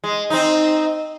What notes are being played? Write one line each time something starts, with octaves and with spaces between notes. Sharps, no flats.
G#3
C4 D#4